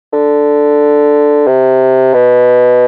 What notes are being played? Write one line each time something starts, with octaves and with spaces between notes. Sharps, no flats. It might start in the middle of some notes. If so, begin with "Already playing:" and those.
D3
C3
B2